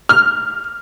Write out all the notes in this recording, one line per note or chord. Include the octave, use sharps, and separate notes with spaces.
F6